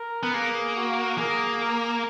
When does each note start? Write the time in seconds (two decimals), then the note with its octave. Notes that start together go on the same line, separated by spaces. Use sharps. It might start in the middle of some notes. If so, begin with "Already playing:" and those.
Already playing: A#4
0.23 B3
0.34 A#3 G#4
0.76 F#4
1.18 A#3 G#4
1.60 A#4